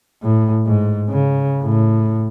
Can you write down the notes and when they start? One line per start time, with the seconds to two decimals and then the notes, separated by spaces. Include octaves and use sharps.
0.22 A2
0.65 G#2
1.10 C#3
1.62 A2